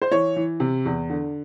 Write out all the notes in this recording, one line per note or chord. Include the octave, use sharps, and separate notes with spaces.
C5
E3 C#5
E3
C3
E2
D3